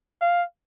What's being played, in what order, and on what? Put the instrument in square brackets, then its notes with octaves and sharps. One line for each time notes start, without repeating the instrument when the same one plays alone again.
[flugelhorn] F5